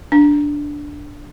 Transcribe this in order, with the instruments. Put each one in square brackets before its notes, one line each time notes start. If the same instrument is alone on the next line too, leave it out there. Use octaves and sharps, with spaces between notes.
[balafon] D4